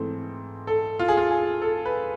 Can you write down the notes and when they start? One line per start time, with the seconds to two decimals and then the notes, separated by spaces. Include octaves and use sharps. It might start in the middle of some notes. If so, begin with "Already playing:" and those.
Already playing: G#2 E3 A3 C4 A4
0.67 A4
0.99 F4
1.08 G#4
1.17 F4
1.30 G#4
1.62 A4
1.85 B4